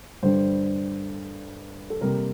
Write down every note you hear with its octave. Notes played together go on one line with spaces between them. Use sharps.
G2 D3 G3 D4 C5
A4
C3 G3 A#3 A#4